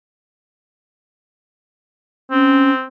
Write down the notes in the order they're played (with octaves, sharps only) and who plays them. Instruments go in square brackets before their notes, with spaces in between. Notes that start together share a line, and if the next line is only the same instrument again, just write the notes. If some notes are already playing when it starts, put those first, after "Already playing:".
[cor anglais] C4 [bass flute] C#4